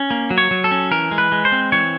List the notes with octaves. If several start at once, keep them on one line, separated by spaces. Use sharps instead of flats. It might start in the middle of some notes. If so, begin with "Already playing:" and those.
Already playing: C#4
A#3
F#3
C#5
F#3
A4
C#4
E3 A#4
G#3
B4
G#3
C5
C4
E3 C#5